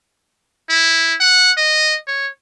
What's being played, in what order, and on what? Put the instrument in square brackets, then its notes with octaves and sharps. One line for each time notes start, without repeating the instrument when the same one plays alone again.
[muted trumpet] E4
F#5
D#5
C#5